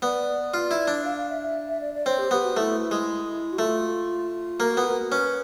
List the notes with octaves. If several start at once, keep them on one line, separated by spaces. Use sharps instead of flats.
B3 D5
F4
E4
D4
F5
F5
E5
E5
E5
D5
D5
C4 C#5
G4
B3 G4
F#4
A3 E4
G#3
F#4
A3 F4
A#3 F#4
B3
A#4
C#4 B4